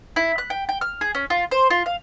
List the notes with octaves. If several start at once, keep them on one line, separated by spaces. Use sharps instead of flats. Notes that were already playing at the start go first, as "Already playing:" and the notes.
E4
F#6
G5
G5
F6
G#4
C#4
F4
C5
F4
F5